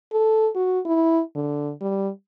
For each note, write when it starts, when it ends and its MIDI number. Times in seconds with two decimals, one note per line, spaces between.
0.12 0.49 69
0.55 0.80 66
0.85 1.22 64
1.36 1.72 50
1.81 2.10 55